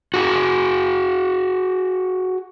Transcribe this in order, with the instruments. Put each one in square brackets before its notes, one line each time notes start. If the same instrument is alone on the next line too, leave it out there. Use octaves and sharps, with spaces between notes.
[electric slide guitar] F#4 G#4